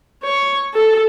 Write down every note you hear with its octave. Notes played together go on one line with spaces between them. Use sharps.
C#5
A4